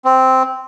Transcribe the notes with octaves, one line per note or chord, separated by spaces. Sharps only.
C4